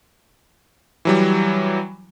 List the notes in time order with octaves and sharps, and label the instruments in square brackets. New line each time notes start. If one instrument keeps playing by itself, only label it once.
[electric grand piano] E3 F#3 G3